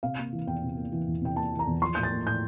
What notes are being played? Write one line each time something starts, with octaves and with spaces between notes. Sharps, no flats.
C3 F5
A#3
E3
E2 G5
C3
A#3
E3
E2
C3 G5
A#3 A5
E3
A#5
E2
F3 C6
A2 G6
A6
A#3
A2 G6